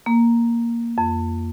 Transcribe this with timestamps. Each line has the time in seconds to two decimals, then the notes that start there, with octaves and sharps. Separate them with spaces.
0.06 A#3
0.98 F2